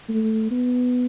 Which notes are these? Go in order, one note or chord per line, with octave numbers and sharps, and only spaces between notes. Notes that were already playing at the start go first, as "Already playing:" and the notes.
A3
B3